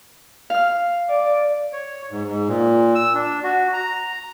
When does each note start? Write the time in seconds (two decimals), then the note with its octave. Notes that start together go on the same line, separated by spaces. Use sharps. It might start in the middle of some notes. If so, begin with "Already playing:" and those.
0.50 F5 F6
1.09 D5
1.73 C#5
2.11 G#2
2.28 G#2
2.48 A#2
2.95 E6
3.14 D4
3.44 F#4
3.73 A#5